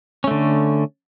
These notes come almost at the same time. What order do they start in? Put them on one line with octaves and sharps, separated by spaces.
C#4 A3 D3